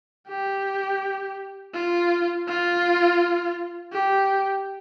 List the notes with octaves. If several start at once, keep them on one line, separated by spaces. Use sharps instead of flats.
G4
F4
F4
G4